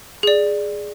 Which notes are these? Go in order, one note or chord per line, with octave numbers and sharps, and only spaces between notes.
G#4 D5